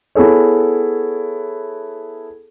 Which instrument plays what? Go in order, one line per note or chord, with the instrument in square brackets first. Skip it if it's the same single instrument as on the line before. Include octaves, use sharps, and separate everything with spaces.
[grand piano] B3 E4 G#4 A4 C#5